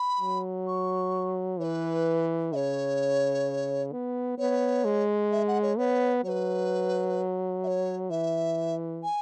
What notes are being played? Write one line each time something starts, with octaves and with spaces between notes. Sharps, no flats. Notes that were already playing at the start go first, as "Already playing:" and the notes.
Already playing: B5
F#3
C#6
E3 B4 C#5
C#3 C#5 E5
B3
B3 C#5
G#3
E5
F#5
C#5
B3 C#5
F#3 B4 C#5
E5
C#5
E3 E5
G#5